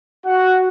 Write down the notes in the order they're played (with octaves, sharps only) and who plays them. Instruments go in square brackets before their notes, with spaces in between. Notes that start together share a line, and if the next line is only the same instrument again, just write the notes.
[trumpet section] F#4 F#5